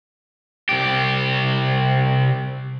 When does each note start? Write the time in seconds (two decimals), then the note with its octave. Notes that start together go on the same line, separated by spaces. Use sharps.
0.69 C2 G4